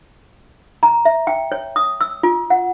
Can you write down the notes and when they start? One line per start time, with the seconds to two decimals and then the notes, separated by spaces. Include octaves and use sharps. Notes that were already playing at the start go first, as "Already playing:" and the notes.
0.83 A#5
1.05 E5
1.27 G5
1.52 C#5
1.76 D#6
2.01 E6
2.23 F4
2.50 F#5